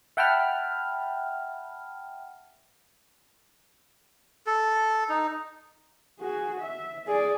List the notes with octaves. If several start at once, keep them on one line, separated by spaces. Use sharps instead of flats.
E5 F#5 G5 A5 B5 F6
A4
D#4
F#4 G#4
E5
G#4 D5